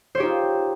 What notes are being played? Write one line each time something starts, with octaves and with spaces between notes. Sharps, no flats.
D#4 F4 G4 C5 C#5